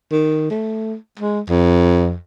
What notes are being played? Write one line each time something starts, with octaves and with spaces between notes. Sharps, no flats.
D#3
A3
G#3
F2